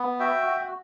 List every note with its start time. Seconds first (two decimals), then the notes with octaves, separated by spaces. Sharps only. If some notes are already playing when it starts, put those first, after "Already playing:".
Already playing: B3
0.20 F#4 E5 G5
0.46 F#4